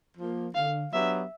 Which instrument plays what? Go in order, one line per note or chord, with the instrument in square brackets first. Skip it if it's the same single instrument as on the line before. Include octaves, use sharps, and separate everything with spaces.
[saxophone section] F3 A#3
[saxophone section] D3 [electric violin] F5
[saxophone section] F#3 B3 D4 G4 [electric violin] E5